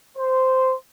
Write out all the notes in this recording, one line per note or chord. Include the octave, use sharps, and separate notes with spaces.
C5